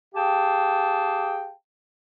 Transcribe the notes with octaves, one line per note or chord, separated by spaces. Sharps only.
G4 G#4 F5 G5 A5